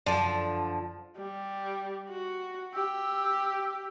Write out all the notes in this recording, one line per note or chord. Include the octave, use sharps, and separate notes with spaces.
F#2 D3 F3 D5
G3
F#4
G4 E6